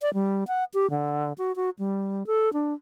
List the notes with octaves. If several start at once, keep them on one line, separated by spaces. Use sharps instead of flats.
D5
G3
F#5
G4
D3
F#4
F#4
G3
A4
D4